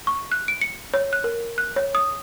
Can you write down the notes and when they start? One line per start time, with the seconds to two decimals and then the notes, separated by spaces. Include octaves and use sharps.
0.07 C#6
0.32 F#6
0.48 D7
0.61 C#7
0.94 C#5
1.13 F#6
1.24 A#4
1.58 F#6
1.76 C#5
1.95 D#6